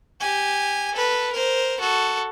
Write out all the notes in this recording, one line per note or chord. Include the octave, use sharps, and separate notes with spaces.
G4 G#5
A4 B4
A#4 C5
F#4 A4